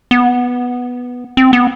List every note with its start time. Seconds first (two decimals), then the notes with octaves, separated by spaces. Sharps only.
0.11 B3
1.37 C4
1.53 B3